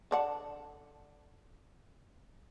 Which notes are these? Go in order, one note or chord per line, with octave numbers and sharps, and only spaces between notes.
D3 D4 F#5